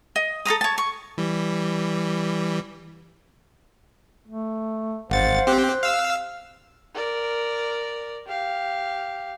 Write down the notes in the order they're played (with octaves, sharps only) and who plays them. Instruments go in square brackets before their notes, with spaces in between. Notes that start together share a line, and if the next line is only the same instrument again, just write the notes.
[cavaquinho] D#5
A4 C5 A#5 D#6
C#5 A5
C#6
[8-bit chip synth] E3 G3
[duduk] A3
[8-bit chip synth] G#1 A6 [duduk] C5 [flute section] F5 F#5
[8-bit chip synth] C4 G4 [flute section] F#6
[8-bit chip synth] F5 E6
[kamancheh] A#4 D5
G4 F5